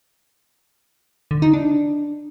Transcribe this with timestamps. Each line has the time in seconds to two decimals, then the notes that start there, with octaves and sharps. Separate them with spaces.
1.31 D3
1.42 D#4
1.53 D4